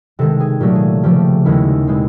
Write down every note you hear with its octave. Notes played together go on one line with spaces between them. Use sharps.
C3 D#3 G#3 A4
G#4
A#2 F#3 A3 G4
G#4
C#3 F3 A3 G4
D#2 D#3 G#3 C#4 E4
B2 G#3 C4